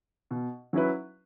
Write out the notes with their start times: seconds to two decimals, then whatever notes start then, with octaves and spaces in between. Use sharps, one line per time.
0.31 B2
0.73 F#3 C#4 E4 B4